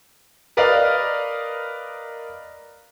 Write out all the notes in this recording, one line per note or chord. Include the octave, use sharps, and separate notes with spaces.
A#4 B4 D5 D#5 F5